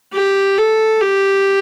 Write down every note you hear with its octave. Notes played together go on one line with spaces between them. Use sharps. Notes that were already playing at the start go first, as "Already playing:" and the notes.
G4
A4
G4